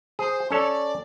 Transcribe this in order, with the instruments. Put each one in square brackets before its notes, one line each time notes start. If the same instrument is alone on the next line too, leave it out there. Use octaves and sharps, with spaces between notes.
[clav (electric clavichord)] G#4 [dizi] C5
[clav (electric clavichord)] C#4 A4 C#5 [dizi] D5